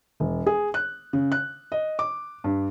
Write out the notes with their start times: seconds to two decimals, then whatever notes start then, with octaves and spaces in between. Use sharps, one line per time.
0.20 E1
0.46 G#4
0.74 F#6
1.13 C#3
1.32 F#6
1.72 D#5
1.99 D6
2.44 G2